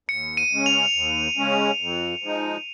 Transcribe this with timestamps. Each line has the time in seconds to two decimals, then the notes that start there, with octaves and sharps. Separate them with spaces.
0.09 D#2 C#7
0.37 D#7
0.51 C#3 G#3 C#4
0.66 F7
0.94 D#2
1.37 C#3 G#3 C#4
1.81 F2
2.23 F3 G#3 D#4